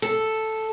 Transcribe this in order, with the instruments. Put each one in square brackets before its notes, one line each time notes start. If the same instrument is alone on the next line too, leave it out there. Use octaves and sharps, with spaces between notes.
[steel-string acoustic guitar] A4